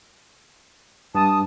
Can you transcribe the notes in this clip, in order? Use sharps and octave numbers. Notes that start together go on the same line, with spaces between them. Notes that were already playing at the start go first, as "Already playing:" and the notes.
G2 A5 D#6